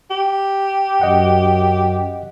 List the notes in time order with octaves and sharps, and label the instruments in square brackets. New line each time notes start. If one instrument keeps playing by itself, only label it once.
[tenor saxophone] G4
[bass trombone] F#2 [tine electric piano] D#5 F#5